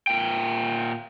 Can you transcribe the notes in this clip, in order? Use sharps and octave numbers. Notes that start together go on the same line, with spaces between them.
A#2 G5